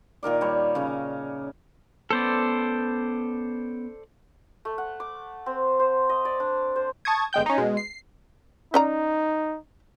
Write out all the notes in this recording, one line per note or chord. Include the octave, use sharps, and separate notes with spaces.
A#2 D#3 A#4 D5
G3 C#5
C#3 C#4
B3 C#4 A4 B4 C5 D5
A3
F#5
D6
C4
C5
D#5
D5
D4
C5
A5 C#6 D#6 G#6
G1 G#3 G5 G6
C#4 D#4
B2 G#3
C7
C#4 D#4 D5 A#5